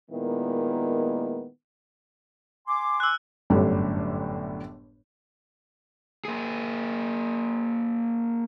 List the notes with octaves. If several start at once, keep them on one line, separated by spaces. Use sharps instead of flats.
A#2 D#3 G#3 A#3 B3 E4
G#5 C6 D6
E6 F#6
G1 F#2 A2 D3 G3
A#3 G#4